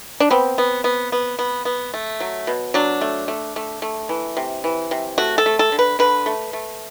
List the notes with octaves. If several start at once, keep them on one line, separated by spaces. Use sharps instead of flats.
D4
B3 C4
B3
B3
B3
B3
B3
A3
F#3
B2
F#3 D4
A3
A3
A3
A3
E3
C3
E3
C3
A3 F#4
A4
A3
A4
D3
B4
D3 B4
A3
A3